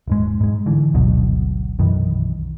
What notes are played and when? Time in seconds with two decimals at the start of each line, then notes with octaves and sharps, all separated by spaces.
0.07 D#1 G#2 G#3
0.41 G#2 G#3
0.66 D3 E3
0.94 G#1 D2 B2 F#3
1.79 B1 F#2 D#3 E3